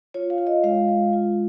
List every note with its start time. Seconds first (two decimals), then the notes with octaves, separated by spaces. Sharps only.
0.14 F4 C#5
0.30 F5
0.38 F4
0.47 D#5
0.63 G#3 F5
0.88 G#3
1.13 F4